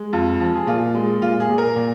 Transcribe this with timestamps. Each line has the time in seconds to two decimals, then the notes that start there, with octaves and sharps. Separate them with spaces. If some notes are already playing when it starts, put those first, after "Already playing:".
Already playing: G#3
0.13 F2 F4
0.40 F3
0.55 G#4
0.67 A#2 F4
0.95 G#3
1.22 A#2 F4
1.40 G#4
1.49 A#2
1.58 A#4
1.76 A#2